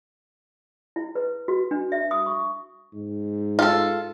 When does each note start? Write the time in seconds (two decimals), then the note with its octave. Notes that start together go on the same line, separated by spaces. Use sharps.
0.96 E4
1.15 B4
1.48 F#4
1.71 D4
1.92 E5
2.11 D#6
2.26 C#6
2.94 G#2
3.59 F4 A4